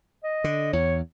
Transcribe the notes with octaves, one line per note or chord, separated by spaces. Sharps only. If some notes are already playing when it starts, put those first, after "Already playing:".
D#5
D3
E2 C#5